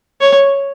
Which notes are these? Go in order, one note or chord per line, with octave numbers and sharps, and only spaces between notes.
C#5